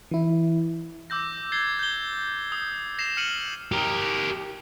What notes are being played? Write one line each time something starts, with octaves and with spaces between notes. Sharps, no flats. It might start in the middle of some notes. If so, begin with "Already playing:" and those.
E3 E4
D6 E6 G6 A#6
G#6 A6 C7 G7
G6 G7
D#6
A#6 C7 E7 F7
F6 C#7 D#7 F#7
G4 A#4